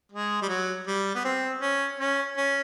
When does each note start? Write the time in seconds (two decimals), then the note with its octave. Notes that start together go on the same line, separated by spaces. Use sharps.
0.12 G#3
0.42 G3
0.49 F#3
0.87 G3
1.15 B3
1.25 C4
1.62 C#4
1.99 C#4
2.37 C#4